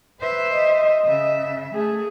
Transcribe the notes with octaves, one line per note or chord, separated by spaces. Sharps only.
B4 C5 E5
D#5
C#3 E5
A3 G#4